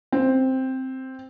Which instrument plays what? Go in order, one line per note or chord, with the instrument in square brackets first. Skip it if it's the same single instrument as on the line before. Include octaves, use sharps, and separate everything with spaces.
[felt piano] C4